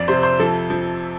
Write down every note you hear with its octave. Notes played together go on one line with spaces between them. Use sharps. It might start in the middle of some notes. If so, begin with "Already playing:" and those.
Already playing: F2 F3 D5
C3 C5
C5
F3 A4
F3